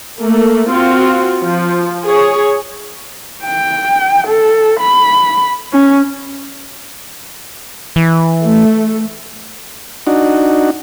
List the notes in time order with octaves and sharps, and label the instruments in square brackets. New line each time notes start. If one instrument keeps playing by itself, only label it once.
[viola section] A3 A#3
C4 F4 F#4
F3
G#4 C#5
[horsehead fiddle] G5
A4
B5
C#4
[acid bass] E3
[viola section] A3
[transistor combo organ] D4 D#4 F#4